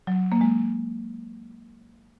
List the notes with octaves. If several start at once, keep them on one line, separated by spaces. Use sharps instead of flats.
F#3
A#3
G#3